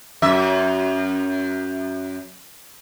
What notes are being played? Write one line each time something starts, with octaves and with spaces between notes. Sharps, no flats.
F#2 E5